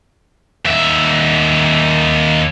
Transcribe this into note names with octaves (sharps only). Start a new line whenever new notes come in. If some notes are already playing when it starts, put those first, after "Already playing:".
D#2 E5